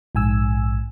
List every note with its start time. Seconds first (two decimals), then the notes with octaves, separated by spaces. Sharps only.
0.15 A#1 G#2 G#5 E6